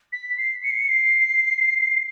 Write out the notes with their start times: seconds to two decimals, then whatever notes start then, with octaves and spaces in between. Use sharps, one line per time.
0.13 B6
0.38 C7
0.63 C#7
0.71 C7
0.77 C#7
0.89 C7